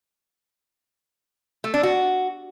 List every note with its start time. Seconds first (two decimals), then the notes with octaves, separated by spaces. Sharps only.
1.64 A3
1.74 D4
1.83 F#4